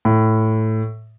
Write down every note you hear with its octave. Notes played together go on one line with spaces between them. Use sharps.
A2